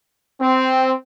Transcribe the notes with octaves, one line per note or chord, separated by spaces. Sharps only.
C4